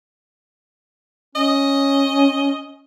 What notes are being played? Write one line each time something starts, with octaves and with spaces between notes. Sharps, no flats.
C#4 D#5